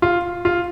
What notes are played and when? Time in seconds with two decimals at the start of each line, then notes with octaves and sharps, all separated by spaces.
0.02 F4
0.45 F4